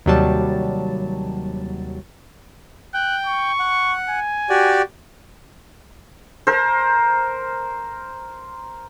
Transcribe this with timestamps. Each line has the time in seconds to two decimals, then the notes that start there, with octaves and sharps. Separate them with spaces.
0.06 D#2 C3 F#3 G3 A5
2.94 G5 F#6
3.26 C#6
3.59 F#5
4.09 G#5
4.49 F#4 G4 D5
6.47 A#4 C5